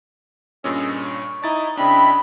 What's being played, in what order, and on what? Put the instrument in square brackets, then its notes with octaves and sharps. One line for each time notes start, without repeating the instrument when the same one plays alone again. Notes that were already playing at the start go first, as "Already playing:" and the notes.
[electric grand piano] G2 A#2 C#4 [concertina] G#4 D#5 E6
[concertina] C#6
[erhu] D#4 [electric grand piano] E4 A6
[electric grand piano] C#3 D4 [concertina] C4 E4 D#5 [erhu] B5